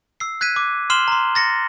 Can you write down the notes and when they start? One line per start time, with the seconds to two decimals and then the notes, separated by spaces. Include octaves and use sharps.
0.20 E6 C7
0.41 F#6 G#6 B6 D#7
0.56 D6
0.90 C6 F6 C7 E7 F#7 G7
1.08 A#5 C6
1.35 A6 A#6 C#7